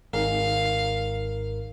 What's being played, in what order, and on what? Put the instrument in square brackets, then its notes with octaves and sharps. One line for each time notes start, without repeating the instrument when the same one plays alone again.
[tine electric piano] G#1 G#2 A#4 [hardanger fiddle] F5